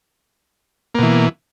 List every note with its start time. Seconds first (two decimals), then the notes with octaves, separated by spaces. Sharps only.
0.95 A#3
0.99 B2
1.03 E3